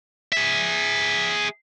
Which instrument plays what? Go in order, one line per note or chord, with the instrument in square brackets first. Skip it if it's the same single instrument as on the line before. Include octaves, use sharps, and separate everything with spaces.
[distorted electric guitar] G#4 E5